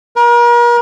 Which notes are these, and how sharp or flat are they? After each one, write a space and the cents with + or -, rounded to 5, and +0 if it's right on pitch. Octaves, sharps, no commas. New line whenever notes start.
A#4 +40